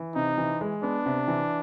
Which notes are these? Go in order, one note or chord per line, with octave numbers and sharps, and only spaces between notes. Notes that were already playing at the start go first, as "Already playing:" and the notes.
Already playing: E3
C3 D#4
E3
G#3
B3 D4
C3
E3